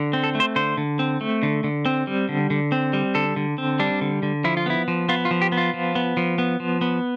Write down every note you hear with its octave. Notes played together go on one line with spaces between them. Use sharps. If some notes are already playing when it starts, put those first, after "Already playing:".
Already playing: D3
C4
A4
A3
C5
D3 C5
D3
C4
A3
D3
D3
C4
G3
D3
D3
C4
G3
D3 A4
D3
C4
G3 D4
D3
D3
F3 E4
F4
B3 E4
F3
B3 F4
F4
F3
G4
B3
F4
F3
B3
F3
B3
F3
B3